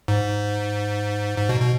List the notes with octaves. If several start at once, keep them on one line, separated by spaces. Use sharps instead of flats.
G#2
G#2
B2
B2